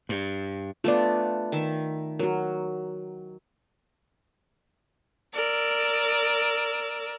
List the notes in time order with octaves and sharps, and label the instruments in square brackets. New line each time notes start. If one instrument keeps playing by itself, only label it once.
[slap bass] G2
[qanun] A3 B3 D4 [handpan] F4 D5
[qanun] D#3 E5
[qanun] F#3 [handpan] F#4 A#4
[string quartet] A#4 D5 E6